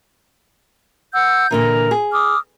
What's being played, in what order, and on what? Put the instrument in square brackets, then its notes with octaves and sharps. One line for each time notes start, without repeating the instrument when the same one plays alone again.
[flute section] F#5 E6 G6
[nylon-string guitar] A#2 D3 E3 [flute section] A#4 A#5
[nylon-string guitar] G#4
[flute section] D6 D#6 F6